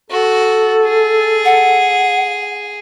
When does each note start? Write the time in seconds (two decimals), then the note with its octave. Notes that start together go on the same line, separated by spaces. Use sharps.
0.10 F#4 A4
0.85 G#4
1.45 F#5